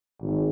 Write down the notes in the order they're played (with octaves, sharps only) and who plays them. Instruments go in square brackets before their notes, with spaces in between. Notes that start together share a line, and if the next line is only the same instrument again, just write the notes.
[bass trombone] G#1